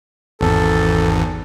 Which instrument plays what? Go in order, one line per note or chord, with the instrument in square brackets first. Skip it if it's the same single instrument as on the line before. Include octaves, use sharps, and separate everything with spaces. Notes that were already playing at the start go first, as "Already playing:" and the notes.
[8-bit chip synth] G#1 E2 [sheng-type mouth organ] A4